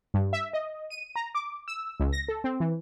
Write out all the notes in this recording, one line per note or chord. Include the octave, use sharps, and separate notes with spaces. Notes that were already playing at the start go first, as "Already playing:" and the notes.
G2
E5
D#5
D#7
A#5
D6
E6
C#2
A#6
A4
C4
E3